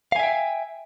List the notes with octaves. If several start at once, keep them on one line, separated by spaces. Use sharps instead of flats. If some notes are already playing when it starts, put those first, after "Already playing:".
E5 F5 G5 G#5